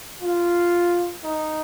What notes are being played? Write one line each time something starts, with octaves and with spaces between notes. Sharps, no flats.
F4
D#4